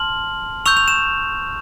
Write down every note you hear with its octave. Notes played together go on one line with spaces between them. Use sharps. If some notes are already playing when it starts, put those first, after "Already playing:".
Already playing: A5 C6 F6 F#7
C#6 E6 G6 F7
F7
E7